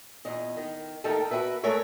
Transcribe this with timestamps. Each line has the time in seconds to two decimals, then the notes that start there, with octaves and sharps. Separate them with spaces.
0.25 E2 A#2 D#5
0.57 D#3
1.04 D#2 D#3 A3 A4 A#4 G5
1.31 F#4 G#4 A#4 B4 E5
1.63 G#3 A3 A#4 C#5 E5